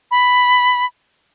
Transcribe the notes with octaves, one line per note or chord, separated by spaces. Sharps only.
B5